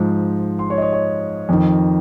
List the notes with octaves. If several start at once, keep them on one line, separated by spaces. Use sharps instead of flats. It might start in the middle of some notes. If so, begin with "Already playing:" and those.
Already playing: G#2 F3
C6
C#5
D#5
C#5
C#5
F2 D#3